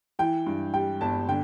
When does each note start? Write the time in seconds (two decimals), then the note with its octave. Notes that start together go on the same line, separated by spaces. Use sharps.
0.19 E3 G5
0.46 G2
0.74 G3 G5
1.01 G1 A5
1.29 D3 G5